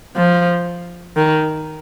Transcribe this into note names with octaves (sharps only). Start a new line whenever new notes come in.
F3
D#3